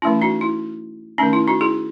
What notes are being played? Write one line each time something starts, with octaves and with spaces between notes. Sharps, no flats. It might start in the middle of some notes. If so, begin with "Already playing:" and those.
E3 A3 C#4 E4
D#4 F#4
E4
D#3 A3 C#4 D#4
E4
D#4 F#4
E4 G#4